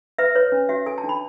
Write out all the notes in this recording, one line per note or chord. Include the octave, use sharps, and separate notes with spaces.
B4 E5
B4 C#5
C#4
F#4 E5
A4 G#5
A5
D4
B5